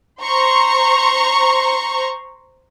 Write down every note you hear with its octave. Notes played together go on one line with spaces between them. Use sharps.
C5 A#5 C6 C#6